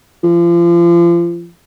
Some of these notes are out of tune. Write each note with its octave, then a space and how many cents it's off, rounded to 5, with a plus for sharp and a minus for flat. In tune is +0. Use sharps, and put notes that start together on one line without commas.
F3 -35